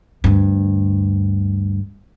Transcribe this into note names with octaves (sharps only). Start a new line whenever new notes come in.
D2 G2